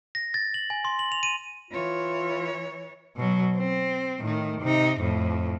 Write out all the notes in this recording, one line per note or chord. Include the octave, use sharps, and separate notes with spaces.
A#6
A6
F#7
G#5
C6
F#7
F7
D#7
E3 F4 C#5
B2 F#3
C4
A2 D#3
C3 D#4
F2 A2